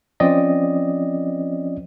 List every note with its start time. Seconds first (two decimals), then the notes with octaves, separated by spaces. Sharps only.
0.20 F3 C4 C#4 D5 D#5